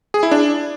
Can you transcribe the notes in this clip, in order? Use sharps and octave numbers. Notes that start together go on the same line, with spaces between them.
G#4
E4
D4